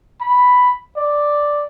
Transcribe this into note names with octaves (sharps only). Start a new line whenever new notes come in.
B5
D5